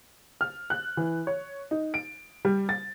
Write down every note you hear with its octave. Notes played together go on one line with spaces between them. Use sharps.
F6
F#6
E3
C#5
D#4
D7
G3
A6